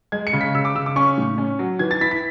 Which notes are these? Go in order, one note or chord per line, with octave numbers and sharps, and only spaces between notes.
G#3 G#6
C#7
C#3
B6
C#3 E6
D6
C#3 E6
D6
C#4 C#6
A2
C#4
F#3
E3 G#6
A6
E4 B6
B6